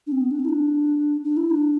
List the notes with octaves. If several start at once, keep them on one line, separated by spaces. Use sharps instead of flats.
D4
C4
B3
D4
C4
E4
D4
D4
E4
D4